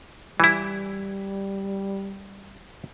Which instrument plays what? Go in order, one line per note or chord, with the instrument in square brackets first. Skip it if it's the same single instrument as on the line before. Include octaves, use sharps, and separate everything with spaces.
[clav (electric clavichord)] E3 E4 [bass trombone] G3